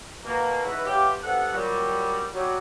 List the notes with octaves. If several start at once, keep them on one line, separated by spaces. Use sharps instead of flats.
B2 A#3
C#3 E3 D#4 E4 F#4 B4
B3 C#4 E4 F4 G4
G2 F3 G3 B3 A4 F#5
A#2 F#3 G3
F#3 G3